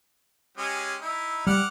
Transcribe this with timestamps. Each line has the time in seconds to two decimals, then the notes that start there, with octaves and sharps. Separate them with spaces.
0.58 G#3 C#4 G4
1.01 D#4 E4
1.47 G3 F#5 D6 F6